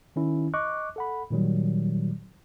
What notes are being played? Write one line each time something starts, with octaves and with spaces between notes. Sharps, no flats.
D#3 C#4 E4
D#5 C#6 D6 F#6
A4 F#5 B5
A#2 D#3 F#3 G3